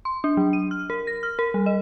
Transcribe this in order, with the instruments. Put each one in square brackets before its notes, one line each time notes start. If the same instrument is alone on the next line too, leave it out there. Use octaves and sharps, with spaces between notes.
[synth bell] C6
D4
F#3
D#7
F6
A#4
A#6
F6
A#4
G3
D#5